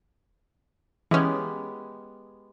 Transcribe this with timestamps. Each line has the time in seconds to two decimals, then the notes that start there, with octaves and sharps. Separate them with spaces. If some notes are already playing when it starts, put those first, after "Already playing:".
1.11 E3 G#3 B3 C#4 G4